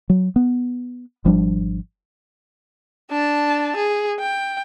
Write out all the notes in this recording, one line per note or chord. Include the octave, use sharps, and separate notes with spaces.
F#3
B3
G#1 F3 G3 D4
D4 A5
G#4
G5